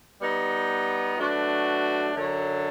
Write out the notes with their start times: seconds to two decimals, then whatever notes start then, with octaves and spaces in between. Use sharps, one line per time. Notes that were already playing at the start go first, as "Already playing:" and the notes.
0.20 G3 B3 D#4
1.17 F#3 A3 D4 F#4 B4
2.13 F#2 D3 F#3